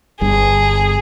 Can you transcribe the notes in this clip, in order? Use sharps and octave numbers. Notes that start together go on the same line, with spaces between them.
G1 G2 G#4